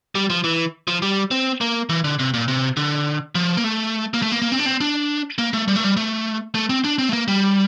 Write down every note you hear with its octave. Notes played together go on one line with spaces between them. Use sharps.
G3
F3
E3
F3
G3
C4
A#3
E3
D3
C3
A#2
C3
D3
F3
A#3
A3
A#3
A3
A#3
A#3
C4
D4
C4
D4
A#3
A3
G3
A3
G3
A3
A3
C4
D4
C4
A3
A#3
G3